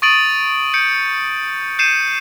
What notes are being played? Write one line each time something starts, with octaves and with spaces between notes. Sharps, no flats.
C#6 D#6 A6 D7 D#7 F#7
G6 C#7 D7
G6 C7 C#7 D#7 E7